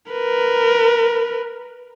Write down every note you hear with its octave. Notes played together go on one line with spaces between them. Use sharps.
A#4 B4